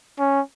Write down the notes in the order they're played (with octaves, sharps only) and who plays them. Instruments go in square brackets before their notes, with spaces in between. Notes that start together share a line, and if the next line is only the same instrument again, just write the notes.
[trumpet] C#4